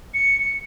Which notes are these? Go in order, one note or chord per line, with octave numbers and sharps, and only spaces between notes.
C#7